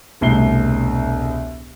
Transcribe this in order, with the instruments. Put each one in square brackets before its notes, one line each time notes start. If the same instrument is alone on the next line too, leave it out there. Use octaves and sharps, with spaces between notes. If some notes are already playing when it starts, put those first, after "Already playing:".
[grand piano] E1 C2 A2 C7 G7